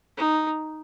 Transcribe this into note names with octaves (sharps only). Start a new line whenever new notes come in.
D#4